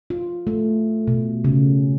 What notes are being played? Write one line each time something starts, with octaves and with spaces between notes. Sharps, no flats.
F4
A3
B2
C#3